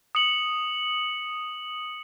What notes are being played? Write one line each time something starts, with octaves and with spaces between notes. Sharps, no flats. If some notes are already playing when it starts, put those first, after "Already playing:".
D#6 C#7 F#7